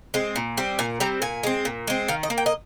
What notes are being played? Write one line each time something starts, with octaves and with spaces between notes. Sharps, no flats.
G#3 C4
A#2
G3 C4
A#2 G#5
G3 C4 A#5
A#2 G#5
G#3 C4
A#2
G#3 C4
D#3 F5
D#5
A#3
G5
D#5